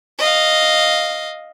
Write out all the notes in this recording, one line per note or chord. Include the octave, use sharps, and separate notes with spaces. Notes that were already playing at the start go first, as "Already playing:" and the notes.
D#5 F5